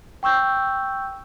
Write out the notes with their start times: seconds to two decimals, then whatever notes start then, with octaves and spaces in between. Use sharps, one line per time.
0.23 G5 C#6 E6 G6